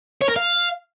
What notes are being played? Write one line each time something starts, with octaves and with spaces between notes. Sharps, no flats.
C#5
A#4
F5